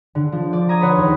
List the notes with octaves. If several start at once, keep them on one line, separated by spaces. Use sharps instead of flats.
D3
F3
D5
A#5 D#6 G#6
B4 C#5 F#5 C6
D#2